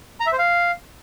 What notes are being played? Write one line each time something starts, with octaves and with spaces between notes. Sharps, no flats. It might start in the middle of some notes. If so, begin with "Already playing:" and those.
A#5
E5
C5
F5